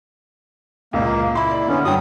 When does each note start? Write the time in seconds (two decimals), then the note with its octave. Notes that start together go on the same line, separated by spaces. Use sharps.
0.93 C#2 A#2 A#3
1.35 E4 B5 C6
1.51 D5
1.68 D3 B3 C#4
1.85 G2 F#3 F#4 G5 D#6